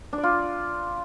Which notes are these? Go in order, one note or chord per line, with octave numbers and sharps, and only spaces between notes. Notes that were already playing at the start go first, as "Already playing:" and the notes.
D4
D5
F4